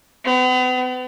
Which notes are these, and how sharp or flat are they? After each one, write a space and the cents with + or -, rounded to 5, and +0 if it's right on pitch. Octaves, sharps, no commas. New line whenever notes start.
B3 +40